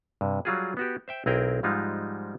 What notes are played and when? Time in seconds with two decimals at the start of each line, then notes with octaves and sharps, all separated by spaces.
0.21 G2 C3
0.45 F#3 G3 F4 F#4 G#4
0.77 B3 F#4 G4
1.08 C5 E5 G5
1.26 B1 C4 E4 G#4 A#4 G5
1.63 G#2 F3 G3 G#3 D#4 F4